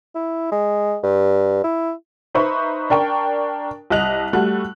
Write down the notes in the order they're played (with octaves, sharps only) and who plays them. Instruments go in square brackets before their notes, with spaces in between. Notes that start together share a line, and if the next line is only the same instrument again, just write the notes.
[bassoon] E4
G#3
G2
E4
[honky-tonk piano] D#4 B4 C5 E5 B5 C#6
D4 A#4 G5 C#6
C2 D#5 F#6 F7
G3 A3 F#4 F#6